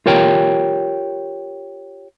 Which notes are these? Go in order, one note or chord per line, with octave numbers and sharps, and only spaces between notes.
F4 G4 A#4 C#5 G5